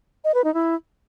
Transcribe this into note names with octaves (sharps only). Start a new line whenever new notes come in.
D#5
B4
D#4
E4